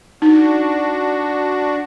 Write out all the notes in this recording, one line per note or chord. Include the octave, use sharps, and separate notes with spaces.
D4 D#4 F#4